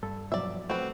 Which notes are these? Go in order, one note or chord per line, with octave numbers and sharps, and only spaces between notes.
G2 A4
B2 F3 F#3 D5 E5
A3 C4 F#4 B4